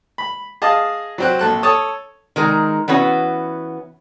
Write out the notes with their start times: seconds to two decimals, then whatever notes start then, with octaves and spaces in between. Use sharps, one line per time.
0.18 B5
0.62 G#4 D#5 F5 A5
1.18 F#3 C4 F#6
1.39 A#1 A4 F#6
1.63 A4 C#5 A5 D#6
2.36 D#3 G#3 A#4
2.88 E3 B3 C#4 F#4